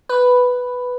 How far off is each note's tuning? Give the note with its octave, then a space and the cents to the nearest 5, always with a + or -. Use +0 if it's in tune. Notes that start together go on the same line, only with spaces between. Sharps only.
B4 +5